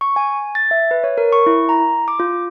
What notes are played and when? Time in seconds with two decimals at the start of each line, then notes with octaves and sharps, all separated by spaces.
0.01 C#6
0.16 G#5
0.55 A6
0.71 E5
0.91 B4
1.04 C#5
1.18 A#4
1.32 C#6
1.46 E4
1.69 A#5
2.08 D6
2.20 F4